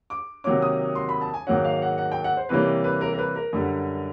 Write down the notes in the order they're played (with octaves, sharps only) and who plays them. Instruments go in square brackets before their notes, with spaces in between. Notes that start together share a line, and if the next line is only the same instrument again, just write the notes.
[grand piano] D6
C3 D#3 F#3 A#3 C#4 D6
D#6
C6
B5
A5
G#5
G#2 D#3 F#3 A#3 C#4 F#5
F5
F#5
F#5
G5
F#5
C5
C3 E3 G3 A#3 C#4 B4
B4
A#4
A#4
B4
A#4
F#2 D3 G3